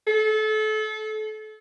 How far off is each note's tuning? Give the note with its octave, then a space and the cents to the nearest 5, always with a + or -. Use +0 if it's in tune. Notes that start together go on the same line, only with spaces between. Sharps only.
A4 -30